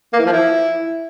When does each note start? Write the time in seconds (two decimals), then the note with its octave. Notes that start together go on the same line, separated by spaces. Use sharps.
0.13 A#3
0.19 E3
0.26 F3
0.32 E4